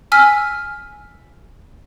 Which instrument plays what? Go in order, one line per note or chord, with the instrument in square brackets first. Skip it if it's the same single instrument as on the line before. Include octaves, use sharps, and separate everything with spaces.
[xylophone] G#5 E6 F6 B6